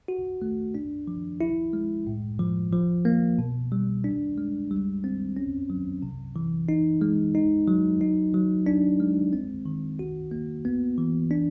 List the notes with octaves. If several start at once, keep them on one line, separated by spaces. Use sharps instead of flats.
F#4
A3
D4
F3
E4
G#3
A2
F3
F3
A#3
B2
G3
D4
G#3
G3
C4
C#4
F#3
C3
E3
D#4
G#3
D#4
F#3
D#4
F#3
D4
G#3
C4
D#3
F#4
A#3
B3
E3
D4